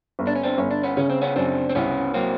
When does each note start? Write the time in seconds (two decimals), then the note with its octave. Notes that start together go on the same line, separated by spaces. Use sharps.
0.19 G1
0.27 D4
0.36 C#4
0.43 C4 D4
0.58 G1 C#4
0.71 D4
0.83 B3 C#4
0.97 C#3 C#4
1.10 C4
1.22 B3 C#4
1.36 F#2 C4 D4
1.70 C4
1.75 C2 B3 C#4
2.14 F#3 A#3 C4